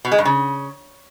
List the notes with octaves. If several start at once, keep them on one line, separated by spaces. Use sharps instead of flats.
B2
G#3
G2
C#3